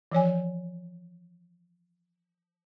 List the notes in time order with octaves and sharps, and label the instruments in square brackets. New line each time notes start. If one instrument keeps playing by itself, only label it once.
[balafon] E3 F3 C#5 G#5